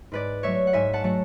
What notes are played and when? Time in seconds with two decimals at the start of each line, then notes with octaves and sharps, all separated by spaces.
0.12 G#2 B4 D5
0.43 F#3 A3 C#5 E5
0.67 F#5
0.73 G#2 E5 G#5
0.93 F#5 A5
1.04 F#3 A3 F#5